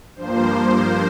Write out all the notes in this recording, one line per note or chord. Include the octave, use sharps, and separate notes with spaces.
G2 F3 A#3 C5